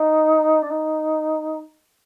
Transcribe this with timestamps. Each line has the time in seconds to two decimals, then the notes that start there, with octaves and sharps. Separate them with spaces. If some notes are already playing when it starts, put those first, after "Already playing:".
Already playing: D#4
0.62 D4
0.70 D#4